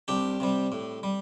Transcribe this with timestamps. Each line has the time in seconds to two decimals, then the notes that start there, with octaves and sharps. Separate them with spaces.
0.08 C2 D4 G4
0.40 C3 G3
0.72 A2
1.03 G3